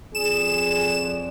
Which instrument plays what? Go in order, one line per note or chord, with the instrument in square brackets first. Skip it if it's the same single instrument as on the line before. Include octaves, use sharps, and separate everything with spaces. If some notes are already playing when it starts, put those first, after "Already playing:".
[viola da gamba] F2 D5 [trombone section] G#4 [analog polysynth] E7